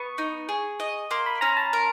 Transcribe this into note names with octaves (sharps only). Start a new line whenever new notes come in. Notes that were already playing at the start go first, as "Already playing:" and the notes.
Already playing: B3 C#6
D#4
G#4
D#5
A#3 C6
B5
C#4 A#5
A5
A#4